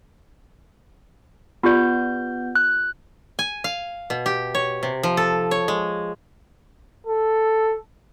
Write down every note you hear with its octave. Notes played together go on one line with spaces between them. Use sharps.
B3 F4 G4 D5 G6
F#6
G#5
F5
B2
G4
C#5
C3
F3
A4
C#5
G#3
A4